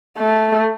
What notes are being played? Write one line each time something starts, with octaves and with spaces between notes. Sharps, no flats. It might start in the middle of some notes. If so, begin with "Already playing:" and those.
A3